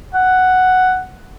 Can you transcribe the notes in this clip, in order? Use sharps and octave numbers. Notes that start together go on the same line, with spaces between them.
F#5